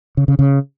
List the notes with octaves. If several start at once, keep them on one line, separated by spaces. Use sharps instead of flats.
C#3
C#3
C#3